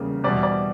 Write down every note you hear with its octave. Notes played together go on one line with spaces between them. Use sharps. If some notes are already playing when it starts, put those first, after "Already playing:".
Already playing: E2 C#3 G3 A#3
E2 B2 G3 D5
D5